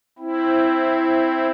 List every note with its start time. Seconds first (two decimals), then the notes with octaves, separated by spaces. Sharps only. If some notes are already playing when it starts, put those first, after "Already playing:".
0.19 C4 E4